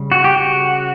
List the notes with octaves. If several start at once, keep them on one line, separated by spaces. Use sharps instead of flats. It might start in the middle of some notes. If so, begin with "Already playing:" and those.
Already playing: C#3 G3
F#4
G4
F#4